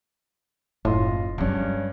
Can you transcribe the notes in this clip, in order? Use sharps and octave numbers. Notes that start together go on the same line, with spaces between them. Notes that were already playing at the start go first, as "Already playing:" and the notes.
F#1 A2 F4 D#5 C6
G2 F#3 G#3 C#4 D5